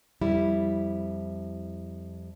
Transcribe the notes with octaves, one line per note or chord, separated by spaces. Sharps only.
F2 G3 E4